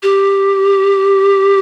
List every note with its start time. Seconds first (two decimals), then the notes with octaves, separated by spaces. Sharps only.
0.03 G4